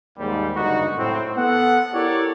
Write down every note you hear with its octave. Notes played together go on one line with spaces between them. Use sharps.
D#2 G#2 G3
F#1 D2 G2 D#4 F#4
A2 C4
B3 A4 F#5
E4 G4 A4 A#4 C#5 D5